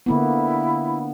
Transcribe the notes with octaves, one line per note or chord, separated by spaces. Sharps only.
D3 A#3 B3 E4